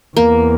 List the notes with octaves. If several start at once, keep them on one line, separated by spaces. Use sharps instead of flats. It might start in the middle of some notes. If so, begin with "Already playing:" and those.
E2 A#3